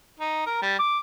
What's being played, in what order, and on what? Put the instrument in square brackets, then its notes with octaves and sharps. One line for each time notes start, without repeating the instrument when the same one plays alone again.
[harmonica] D#4
A#4
G3
D6